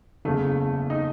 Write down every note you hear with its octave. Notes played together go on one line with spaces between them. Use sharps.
F#1 E2 C#3 A3
D#4